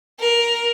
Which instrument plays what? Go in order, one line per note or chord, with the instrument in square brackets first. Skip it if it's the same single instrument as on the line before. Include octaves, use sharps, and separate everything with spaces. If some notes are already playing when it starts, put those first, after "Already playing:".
[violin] A#4